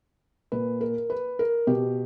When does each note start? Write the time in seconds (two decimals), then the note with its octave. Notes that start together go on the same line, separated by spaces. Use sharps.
0.52 A#2 B4
0.81 A#4
1.10 B4
1.39 A#4
1.67 B2 G4